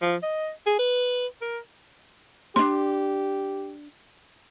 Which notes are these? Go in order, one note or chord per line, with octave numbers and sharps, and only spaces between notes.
F3
D#5
G#4
B4
A#4
C#4 D4 G4 C6